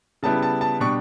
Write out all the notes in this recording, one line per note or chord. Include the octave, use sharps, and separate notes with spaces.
C#3 G3 B3 E4 A5
A5
A5
B2 G3 D4 C#6